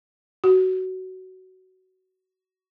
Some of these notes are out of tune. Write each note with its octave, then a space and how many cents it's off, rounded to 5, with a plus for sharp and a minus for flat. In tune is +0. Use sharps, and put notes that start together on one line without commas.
F#4 +15